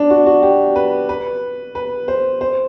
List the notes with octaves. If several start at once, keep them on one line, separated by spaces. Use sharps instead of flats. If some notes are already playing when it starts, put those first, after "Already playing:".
Already playing: D4
F#4
F#4
G4
B4
B4
B4
C5
C5